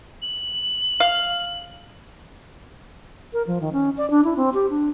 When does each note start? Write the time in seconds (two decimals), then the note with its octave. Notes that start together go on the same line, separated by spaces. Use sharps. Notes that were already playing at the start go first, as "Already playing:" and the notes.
0.22 F#7
1.00 F5
3.33 A#4
3.47 F3
3.61 D#3
3.73 C#4
3.98 D5
4.10 D4
4.24 E4
4.37 C4
4.54 G4
4.70 D4